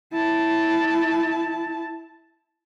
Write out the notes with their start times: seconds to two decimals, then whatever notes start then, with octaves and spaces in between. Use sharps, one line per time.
0.13 E4 A5